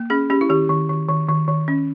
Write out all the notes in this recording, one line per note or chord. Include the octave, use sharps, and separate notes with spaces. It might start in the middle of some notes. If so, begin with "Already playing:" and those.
Already playing: A#3
C#4 G#4
C#4 G4
E4
D#3 G4
D#3
D#3
D#3
D#3
D#3
C#4